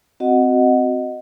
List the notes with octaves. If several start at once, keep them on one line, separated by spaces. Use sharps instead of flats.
C4 F#4 D#5 F#5